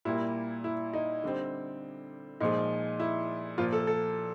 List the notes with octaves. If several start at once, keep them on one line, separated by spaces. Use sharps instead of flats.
A#2 G3 A#3 E4
E4
D#4
D3 G3 C4
A#2 F3 G#3 D#4
E4
A#2 F3 A#3 F4
A4
A4